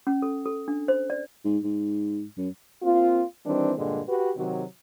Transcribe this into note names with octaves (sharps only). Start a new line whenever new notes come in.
C#4
A4
A4
D4
C5
D5
G#2
G#2
F#2
A#3 C4 F4
D#3 E3 G3 C4 D4
G2 A#2 D3 G#3
F#4 G4 B4
C3 D#3 F#3